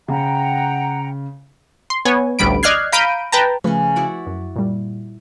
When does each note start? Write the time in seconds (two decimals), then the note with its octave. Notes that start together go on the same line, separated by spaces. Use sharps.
0.08 C#3 F#5 G5 A#5
1.90 C6
2.05 B3 C#5 G#5
2.39 A1 D2 G3 B5 D7
2.63 D5 D#5 F6 F#6 G#6 C7
2.92 F5 A#5 B5 G6 D7 D#7
3.32 B4 G5 A5 A#5
3.64 C#3 F3 A3 C#4 B4
3.96 E4 F#4 D5
4.27 F#2
4.56 A#2 G3